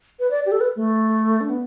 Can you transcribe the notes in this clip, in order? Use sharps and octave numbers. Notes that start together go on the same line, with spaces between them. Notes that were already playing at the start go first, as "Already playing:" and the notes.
B4
D5
G4
A4
B4
A3
D4
B3